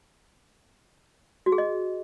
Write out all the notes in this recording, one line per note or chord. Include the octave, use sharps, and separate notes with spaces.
F#4
G#4
D#5